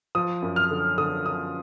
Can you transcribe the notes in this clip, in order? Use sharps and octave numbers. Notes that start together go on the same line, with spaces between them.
F3 D#6
F#2
F6
D3
D3 D#6
D3 D#6